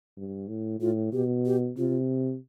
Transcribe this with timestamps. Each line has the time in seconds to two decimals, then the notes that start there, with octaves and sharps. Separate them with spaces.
0.17 G2
0.48 A2
0.80 A2 F4
1.13 B2 G4
1.46 G4
1.78 C3 F4